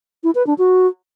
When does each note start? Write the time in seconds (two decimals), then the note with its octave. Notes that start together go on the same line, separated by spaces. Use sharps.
0.23 E4
0.35 B4
0.47 D4
0.58 F#4